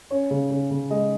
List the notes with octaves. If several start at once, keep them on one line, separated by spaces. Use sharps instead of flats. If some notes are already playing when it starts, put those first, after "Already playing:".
C#4 C#5
C#3
C#3
C#3
G#3 D#5